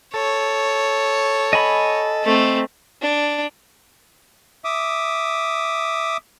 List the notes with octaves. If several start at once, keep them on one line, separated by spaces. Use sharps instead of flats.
A4 C#5
D#5 G#5 B5
A3 C4
D4
E5 D6 D#6